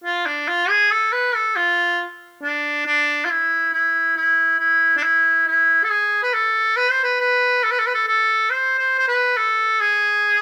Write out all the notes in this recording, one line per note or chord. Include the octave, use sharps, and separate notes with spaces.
F4
D4
F4
G#4
A4
B4
A4
F4
D4
D4
F4
E4
E4
E4
E4
D4
E4
E4
A4
G#4
B4
A4
B4
C5
B4
B4
A4
B4
A4
B4
A4
A4
C5
C5
C5
B4
A4
G#4